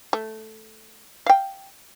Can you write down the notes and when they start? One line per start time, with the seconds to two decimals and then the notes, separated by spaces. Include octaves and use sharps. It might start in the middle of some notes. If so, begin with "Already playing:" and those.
0.13 A3
1.26 F5 G5